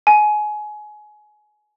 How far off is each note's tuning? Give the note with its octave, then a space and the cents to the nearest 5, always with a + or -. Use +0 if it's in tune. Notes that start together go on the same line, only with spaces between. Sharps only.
G#5 +25